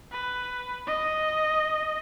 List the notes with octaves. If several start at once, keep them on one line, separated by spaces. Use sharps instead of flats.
B4
D#5